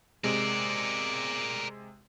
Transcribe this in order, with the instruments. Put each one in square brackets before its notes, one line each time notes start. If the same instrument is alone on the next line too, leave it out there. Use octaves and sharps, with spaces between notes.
[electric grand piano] C3 G#3 [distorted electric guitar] A#4 D5